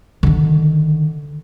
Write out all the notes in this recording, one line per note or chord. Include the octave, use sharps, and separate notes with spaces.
D3 D#3